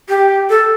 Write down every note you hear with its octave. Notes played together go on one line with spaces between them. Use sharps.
G4
A4